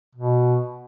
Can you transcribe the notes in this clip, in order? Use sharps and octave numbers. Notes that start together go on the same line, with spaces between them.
B2